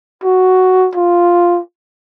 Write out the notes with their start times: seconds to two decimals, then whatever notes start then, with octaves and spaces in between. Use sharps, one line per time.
0.24 F#4
0.95 F4